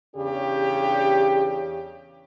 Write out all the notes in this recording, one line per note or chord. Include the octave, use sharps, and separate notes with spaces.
E2 C#3 D4 G4